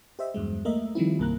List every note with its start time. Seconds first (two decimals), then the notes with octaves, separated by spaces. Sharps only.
0.19 G4 C5 D#5 E5
0.34 E2 G2 F#3 G#3
0.65 A3 A#3 A#4 D#5 E5
0.95 D#3 F3 G3 C4 E4
1.19 C2 G2 A#3 A#5 F#6